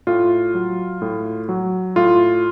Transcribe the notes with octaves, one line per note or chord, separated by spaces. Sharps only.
A2 F4
F#3
A2
F#3
A2 F4